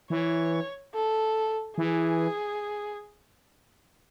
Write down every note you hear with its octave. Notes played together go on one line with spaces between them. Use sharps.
E3 C#5
A4
E3 G#4